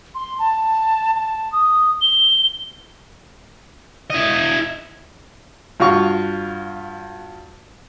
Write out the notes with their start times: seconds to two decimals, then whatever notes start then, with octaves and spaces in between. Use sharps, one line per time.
0.15 C6
0.39 A5
1.15 A5
1.52 D#6
2.01 G7
4.10 E4 D#5
5.80 G2 F4 F#4 F5 C#6